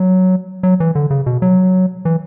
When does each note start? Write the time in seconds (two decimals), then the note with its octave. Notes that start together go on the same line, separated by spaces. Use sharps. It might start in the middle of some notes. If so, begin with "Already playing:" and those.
Already playing: F#3
0.63 F#3
0.80 E3
0.95 D3
1.11 C#3
1.26 B2
1.42 F#3
2.05 E3